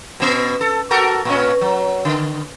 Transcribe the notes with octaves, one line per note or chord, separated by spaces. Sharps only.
B2 B3
A4
F#4 A4 A#4
A#2 C#4
F#3
D3